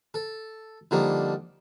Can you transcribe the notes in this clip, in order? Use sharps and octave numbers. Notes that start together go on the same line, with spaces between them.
A4
D3 F3 G3 A#3 D#4